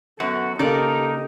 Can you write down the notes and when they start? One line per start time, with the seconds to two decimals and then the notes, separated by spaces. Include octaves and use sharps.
0.20 F#2 B3 F#4 A4
0.59 C#3 A#3 D#4 G4 A4 A#4 D5 D#5